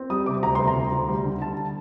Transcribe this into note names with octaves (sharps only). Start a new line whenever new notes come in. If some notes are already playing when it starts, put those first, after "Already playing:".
Already playing: C4
G3 D#6
C3 D6
D2 A#5
C3 C6
A#5
D2
D2
G3
D3
D3 A5